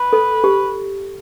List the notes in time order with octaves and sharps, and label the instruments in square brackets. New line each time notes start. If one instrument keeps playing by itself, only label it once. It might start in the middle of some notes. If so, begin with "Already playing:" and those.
Already playing: [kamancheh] B4
[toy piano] A4
G4